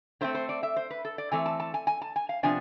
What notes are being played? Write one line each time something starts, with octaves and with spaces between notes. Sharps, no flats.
D3 A3 C4 C5
C5
D5
E5
C5
B4
A4
D5
E3 A3 C4 G#5
A5
A5
G#5
G#5
A5
G#5
F5
C3 F3 B3 D4 G#5